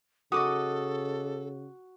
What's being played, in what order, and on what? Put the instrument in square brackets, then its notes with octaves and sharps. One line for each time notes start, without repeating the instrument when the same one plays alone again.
[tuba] C#3 [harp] F#4 [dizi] A4 [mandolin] D#5 D6 D#6